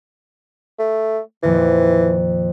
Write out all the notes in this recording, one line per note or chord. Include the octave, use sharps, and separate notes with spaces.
A3
F2 A#2 D#3 E3